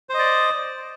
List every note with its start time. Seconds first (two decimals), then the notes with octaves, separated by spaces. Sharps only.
0.10 C5
0.14 D#5
0.19 D5